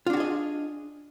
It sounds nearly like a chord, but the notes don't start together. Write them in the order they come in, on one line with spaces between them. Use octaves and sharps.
F4 D4 F#4 G#4 D#5